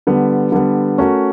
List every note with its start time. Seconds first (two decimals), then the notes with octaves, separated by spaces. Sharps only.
0.07 D3 G3 B3
0.52 D3 G3 B3
0.98 A3 C#4 F#4 A#4